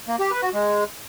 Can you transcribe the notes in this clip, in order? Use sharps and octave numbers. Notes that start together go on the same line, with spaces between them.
A#3
G4
B4
F#4
G#3